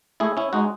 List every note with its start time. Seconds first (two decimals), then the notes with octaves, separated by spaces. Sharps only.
0.20 A3 E4 G#4
0.37 C#4 E4
0.53 G#3 D#4 F#4